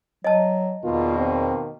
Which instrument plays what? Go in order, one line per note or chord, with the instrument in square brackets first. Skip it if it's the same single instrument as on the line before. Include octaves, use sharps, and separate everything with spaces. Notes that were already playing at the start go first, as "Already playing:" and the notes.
[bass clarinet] F#3 [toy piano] D#5 A5
[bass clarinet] E2 [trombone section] B2 D#3 A#3 [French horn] F4
[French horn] C4